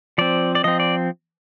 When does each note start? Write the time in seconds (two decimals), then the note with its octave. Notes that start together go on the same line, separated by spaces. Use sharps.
0.18 F3 C4 D5
0.55 D5
0.64 F3 C4 D#5
0.80 D5